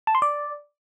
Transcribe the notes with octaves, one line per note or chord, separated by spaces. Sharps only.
A5
C6
D5